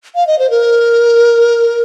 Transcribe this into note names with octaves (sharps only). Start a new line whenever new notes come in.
F5
D#5
C5
A#4